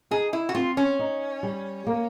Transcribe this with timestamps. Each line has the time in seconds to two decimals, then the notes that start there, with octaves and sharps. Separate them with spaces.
0.11 D#4 G#4
0.33 E4
0.49 F#4
0.55 C4 F4
0.77 C#4
0.99 D#4
1.43 G3
1.87 A#3